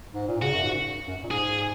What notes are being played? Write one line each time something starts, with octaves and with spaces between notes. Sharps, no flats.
G#2
A#2
C#3 F#4
F#2
G#2
F#2
A#2
G#2 G#4